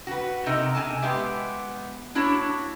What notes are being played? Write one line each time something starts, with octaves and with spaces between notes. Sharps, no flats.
F#4 B4
C3 D#4 A4 A#4 D#5
C3 D4 G#5 A5
G#3 B3 G4 E5
A#3 D4 E4 F#4 C#5 A5